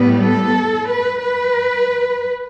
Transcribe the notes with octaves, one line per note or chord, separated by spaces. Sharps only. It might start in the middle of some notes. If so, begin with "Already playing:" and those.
Already playing: A2 G3 B3
A4
B4
B4